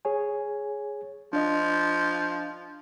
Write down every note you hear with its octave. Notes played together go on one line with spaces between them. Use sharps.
G#4 C#5 G#5
F3 D4 D#5